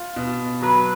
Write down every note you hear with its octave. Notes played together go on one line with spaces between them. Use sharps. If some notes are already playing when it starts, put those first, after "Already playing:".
Already playing: F4
B2
F#3 B4